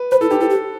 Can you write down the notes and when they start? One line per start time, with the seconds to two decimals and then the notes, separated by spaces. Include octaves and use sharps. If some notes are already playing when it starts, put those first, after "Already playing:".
Already playing: B4
0.11 B4 C5
0.21 E4 A4
0.30 D#4 G4
0.40 E4 A4
0.50 G4